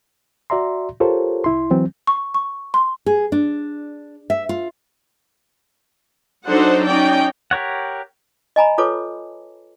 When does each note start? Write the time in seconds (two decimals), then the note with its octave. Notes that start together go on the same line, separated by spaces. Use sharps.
0.50 F#4 D5 E5 A#5 C6
1.00 F4 G4 A4 A#4 C5 C#5
1.44 C2 E4 C6
1.71 E3 F#3 C4
2.07 C#6
2.34 C#6
2.74 C6
3.06 G#4
3.32 D4
4.30 E5
4.49 F4
6.45 F#3 D4 D#4 A4 C5 F#5
6.86 C#4 D#4 D5 G5
7.51 G4 A#4 C#5 F#5
8.56 D#5 G#5 A#5 B5
8.78 F4 A4 B4 C#5 A5 D6